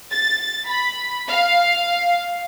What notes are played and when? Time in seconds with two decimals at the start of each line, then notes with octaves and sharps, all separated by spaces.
0.10 A6
0.67 B5
1.27 F5